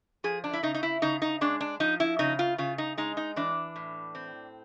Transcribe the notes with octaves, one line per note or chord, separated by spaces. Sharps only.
F3 G#4
D4
E4
C#3 D#4
D#4
E4
C#3 D#4
D#4
G#3 D4
D4
F3 D#4
E4
C#3 D#4
F4
C#3 F4
D#4
G#3 D#4
D#4
E3 D4
A2
C4